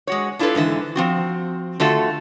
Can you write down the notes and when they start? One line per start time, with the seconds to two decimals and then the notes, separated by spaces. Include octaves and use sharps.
0.07 G#3 F#4 C#5
0.39 D4 E4 F4 G#4 A4 B4
0.55 G#2 D3 E3 E5
0.96 F3 C4 F#4
1.80 D3 A3 F4 F#4 A4 E5